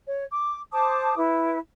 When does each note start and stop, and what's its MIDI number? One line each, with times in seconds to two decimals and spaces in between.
0.06 0.25 73
0.31 0.59 86
0.72 1.17 72
0.72 1.17 81
0.72 1.17 86
0.72 1.17 87
1.17 1.58 64
1.17 1.58 71